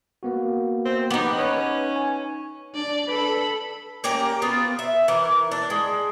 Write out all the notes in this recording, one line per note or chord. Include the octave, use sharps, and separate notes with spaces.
A#3 B3 F#4
C4
B3 D#4 G4
C#4 B4
G#5
D4 D5
A4 B4 B5
A#3 C#4 G4 A#5
B3 C4 F4
E5
E3 A#4
D4
G#3